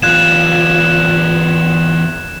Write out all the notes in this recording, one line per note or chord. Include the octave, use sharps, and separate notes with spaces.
E2 F4 F#6 G#6 E7